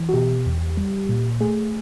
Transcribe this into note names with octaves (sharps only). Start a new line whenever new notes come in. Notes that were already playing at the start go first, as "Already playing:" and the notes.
Already playing: E3
F#4
B2 G4
E2
G3
A#2
A3 G#4